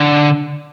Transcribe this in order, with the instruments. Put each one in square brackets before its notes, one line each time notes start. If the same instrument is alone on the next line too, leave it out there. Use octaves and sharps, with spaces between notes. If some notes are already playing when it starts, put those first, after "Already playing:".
Already playing: [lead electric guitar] D3